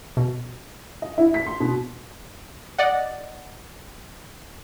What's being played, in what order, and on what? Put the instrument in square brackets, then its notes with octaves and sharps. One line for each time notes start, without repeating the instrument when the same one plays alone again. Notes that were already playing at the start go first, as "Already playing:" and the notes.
[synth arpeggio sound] B2
[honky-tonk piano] D#5
E4
B6
C6
B2
[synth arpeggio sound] D5 D#5 F#5